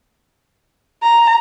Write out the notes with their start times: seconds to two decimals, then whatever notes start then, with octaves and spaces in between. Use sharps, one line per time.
1.02 A#5